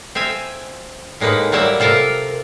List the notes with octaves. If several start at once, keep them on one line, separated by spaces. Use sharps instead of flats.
C4 E5 F5 G#5
A2 G#3 A#3 D#4 B4
F#3 G3 A#3 C#5 E5
C3 F4 A4 A#4